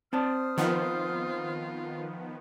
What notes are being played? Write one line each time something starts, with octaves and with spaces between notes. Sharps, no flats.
C4 C5 D5 A5 D#6 F6
D#3 F3 B3 F4